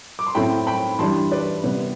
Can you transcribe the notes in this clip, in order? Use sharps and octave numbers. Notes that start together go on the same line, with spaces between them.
D6
C6
A2 F#3 C4 E4 G5 B5
G5 B5
E3 G3 D4 A5 C6
B4 D5
C3 G3 B3 B4